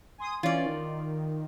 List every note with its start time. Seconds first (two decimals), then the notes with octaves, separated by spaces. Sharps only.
0.18 G#5 C6 D#6
0.43 E3 C#4 F4 D5
0.65 D#3